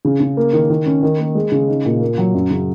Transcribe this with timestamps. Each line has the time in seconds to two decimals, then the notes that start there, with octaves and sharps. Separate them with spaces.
0.05 C#3
0.20 C#3
0.37 A#3
0.53 D#3
0.70 D#3
0.86 C#4
1.03 D#3
1.19 A#3
1.35 G#3
1.52 C#3
1.68 D#4
1.85 A#2
2.01 A#3
2.18 F#3
2.34 F#2
2.51 C#3